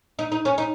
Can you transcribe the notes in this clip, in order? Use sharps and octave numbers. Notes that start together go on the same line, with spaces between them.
D#4
D#4
C#4
D#4